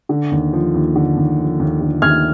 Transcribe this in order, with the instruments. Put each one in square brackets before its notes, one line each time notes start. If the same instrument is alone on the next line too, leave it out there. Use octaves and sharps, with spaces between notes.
[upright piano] D3
D#2
F3
D#2
D3
D#2
F3
D#2
D3
D#2 F6 G#6